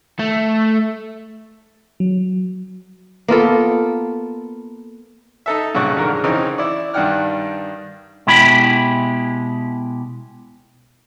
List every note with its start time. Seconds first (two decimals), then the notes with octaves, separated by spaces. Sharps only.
0.19 A3
2.00 F#3
3.28 A#3 B3 F4 A4
5.46 D#4 A4 E5
5.74 G2 A#2 C#3 F#5 C#6
5.96 F2 D3 D#3 G#3 A#4 A#5
6.24 C#3 E3 C4 C#4 D#4
6.58 E4 D5
6.94 G2 D#3 D4 F#5 G5 F6
8.27 B2 G#3 E4 G4 B5